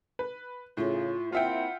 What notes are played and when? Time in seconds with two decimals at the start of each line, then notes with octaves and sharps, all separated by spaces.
0.19 B4
0.77 A2 C#3 F4
1.32 A#3 C4 E4 F4 E5 F#5 G5